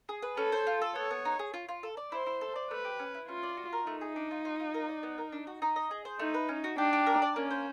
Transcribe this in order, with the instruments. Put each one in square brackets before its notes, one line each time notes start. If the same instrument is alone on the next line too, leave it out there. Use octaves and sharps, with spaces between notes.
[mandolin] G#4
B4
[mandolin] C#4 [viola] A4
[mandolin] C5
F4
A4
[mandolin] B3 [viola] C#5
[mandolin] B3
D#4
G#4
F4
F4
A4
D5
[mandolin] E4 [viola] C5
[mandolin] E4
A4
D5
[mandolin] A3 [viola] B4
[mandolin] G4
C#4
E4
[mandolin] C#4 [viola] F4
[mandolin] D5
F#4
A#4
[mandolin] A3 [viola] D#4
[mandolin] G#4
D4
F4
F4
F4
A#4
D5
B3
A#4
D4
F#4
D#4
D#5
G#4
C5
[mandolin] A3 [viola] D#4
[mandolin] B4
C#4
F#4
[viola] D4 [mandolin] G4
[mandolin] G4
A#4
D5
[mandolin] A#3 [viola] C#4
[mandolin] C5